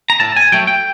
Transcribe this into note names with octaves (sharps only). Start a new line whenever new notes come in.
A#5
A2 A5
G#5
F#3 A3 G5
G5